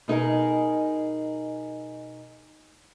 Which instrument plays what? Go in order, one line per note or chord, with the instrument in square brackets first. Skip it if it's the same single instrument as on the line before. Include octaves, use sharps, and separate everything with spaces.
[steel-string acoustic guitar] B2 D#4 G#4 A#4